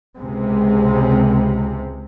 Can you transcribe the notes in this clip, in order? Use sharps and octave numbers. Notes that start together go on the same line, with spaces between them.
C#2 C3 G#3